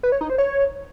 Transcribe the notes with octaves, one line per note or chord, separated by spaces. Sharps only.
B4
C#5
D#4
C5
C#5